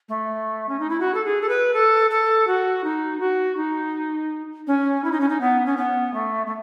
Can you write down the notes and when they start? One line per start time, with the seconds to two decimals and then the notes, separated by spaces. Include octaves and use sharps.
0.09 A3
0.69 C#4
0.79 D#4
0.90 E4
1.00 F#4
1.14 A4
1.25 G#4
1.41 A4
1.49 B4
1.74 A4
2.10 A4
2.47 F#4
2.84 D#4
3.20 F#4
3.57 D#4
4.67 C#4
5.04 E4
5.12 D#4
5.20 C#4
5.29 D#4
5.41 B3
5.66 C#4
5.77 B3
6.14 A3
6.46 A3